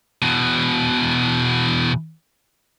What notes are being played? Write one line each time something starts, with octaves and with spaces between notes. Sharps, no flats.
E2 B2